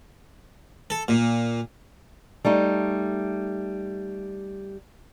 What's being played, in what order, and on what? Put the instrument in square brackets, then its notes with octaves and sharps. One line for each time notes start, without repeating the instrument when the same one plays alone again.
[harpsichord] A4
A#2
[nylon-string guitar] G3 A3 D#4